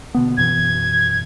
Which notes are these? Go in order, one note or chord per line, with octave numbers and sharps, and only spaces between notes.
B2 D3 B3
F#2 B2 E3 G#6